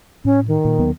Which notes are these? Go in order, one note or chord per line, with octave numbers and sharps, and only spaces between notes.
A2 C#4
D#3
A#2
D#2 F#3 B3